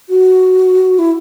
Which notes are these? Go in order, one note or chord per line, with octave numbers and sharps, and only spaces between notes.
F#4
E4